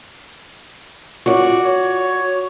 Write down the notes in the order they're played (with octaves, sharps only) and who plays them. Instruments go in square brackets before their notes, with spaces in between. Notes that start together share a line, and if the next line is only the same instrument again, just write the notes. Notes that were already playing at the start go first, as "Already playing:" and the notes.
[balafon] F4 [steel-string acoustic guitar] F#4 D5
[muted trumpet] C#5